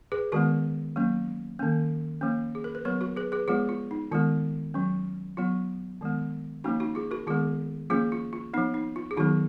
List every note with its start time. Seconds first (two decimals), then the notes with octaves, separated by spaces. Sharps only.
0.12 G#4 B4
0.32 D#3 G#3 B3 F#4 A#4
0.96 F#3 A#3 C#4
1.59 D#3 A#3 C#4
2.21 F3 A#3 C#4
2.55 G#4
2.64 A#4
2.75 B4
2.85 F#3 B3 A#4 C#5
3.01 F#4 A#4
3.17 G#4 B4
3.32 G#4 B4
3.48 F3 G#3 B3 F4 G#4
3.69 F4
3.91 D#4
4.11 D#3 G#3 B3 F4
4.74 F#3 C#4
5.37 F#3 B3 F4
6.01 D#3 G#3 B3
6.64 F3 A#3 C#4 D#4 F#4
6.80 D#4 F#4
6.95 F4 G#4
7.11 F#4 A#4
7.27 D#3 G#3 B3 F4 G#4
7.90 F3 A#3 C#4 F4 G#4
8.12 F4
8.33 F4
8.54 F3 B3 D#4
8.74 D#4
8.96 F4
9.11 G#4
9.17 D#3 F#3 B3 D#4 F#4